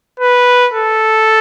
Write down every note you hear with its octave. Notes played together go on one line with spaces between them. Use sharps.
B4
A4